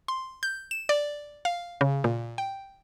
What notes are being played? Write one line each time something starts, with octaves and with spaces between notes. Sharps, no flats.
C6
G6
E7
D5
F5
C#3
A#2
G5